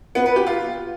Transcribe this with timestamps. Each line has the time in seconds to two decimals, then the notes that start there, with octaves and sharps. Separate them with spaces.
0.15 B3
0.26 B4
0.36 G4
0.46 F4